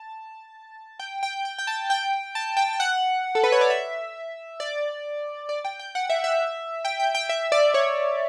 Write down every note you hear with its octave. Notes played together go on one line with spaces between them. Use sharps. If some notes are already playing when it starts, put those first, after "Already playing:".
Already playing: A5
G5
G5
G5
G5
A5
G5
A5
G5
G5
F#5
A4
B4
C#5
D5
E5
D5
D5
G5
G5
F#5
E5
E5
G5
G5
G5
E5
D5
C#5